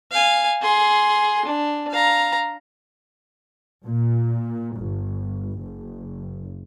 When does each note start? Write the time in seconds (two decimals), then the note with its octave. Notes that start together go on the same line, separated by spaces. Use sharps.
0.11 F5 G#5
0.62 G#4 C6
1.45 D4
1.91 F5 A#5
3.85 A#2
4.76 G1
5.60 F#1